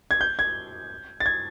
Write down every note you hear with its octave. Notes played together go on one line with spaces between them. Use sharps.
G#6
G6
G#6
A6
G#6